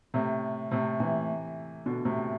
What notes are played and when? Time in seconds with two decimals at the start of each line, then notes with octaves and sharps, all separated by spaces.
0.14 A2 C3
0.71 A2 C3
1.00 C3 E3
1.86 B2 D3
2.05 A2 C3